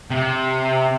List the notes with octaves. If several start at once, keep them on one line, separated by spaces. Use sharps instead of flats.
C3